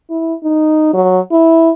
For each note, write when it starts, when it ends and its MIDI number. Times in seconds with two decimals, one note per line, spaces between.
0.10 0.34 64
0.44 0.94 63
0.94 1.20 54
1.32 1.71 64